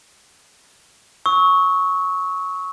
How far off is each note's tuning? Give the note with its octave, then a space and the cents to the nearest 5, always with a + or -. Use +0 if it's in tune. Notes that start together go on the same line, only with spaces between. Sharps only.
C#6 +0 E6 -40